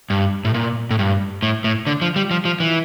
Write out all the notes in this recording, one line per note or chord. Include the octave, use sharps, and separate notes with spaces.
G2
A2
A#2
A2
G2
A2
A2
D3
F3
G3
F3
F3
E3